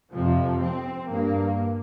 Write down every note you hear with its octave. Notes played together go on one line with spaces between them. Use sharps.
F2 C3 F3
C4
G2 A#3